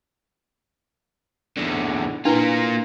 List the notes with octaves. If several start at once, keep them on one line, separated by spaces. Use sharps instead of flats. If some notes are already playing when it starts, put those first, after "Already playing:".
E2 D3
A#3 D4 E4 F4 B4